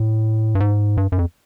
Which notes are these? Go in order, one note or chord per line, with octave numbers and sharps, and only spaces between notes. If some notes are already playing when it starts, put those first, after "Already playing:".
Already playing: A2
G2
G#2
G2
F#2
F2